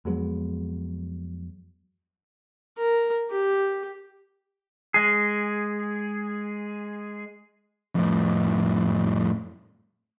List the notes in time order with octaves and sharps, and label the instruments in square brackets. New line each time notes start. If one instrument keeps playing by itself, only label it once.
[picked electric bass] F2 F#3 G#3 B3
[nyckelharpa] A#4
G4
[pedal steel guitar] G#3 G#4
[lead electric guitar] F2 A2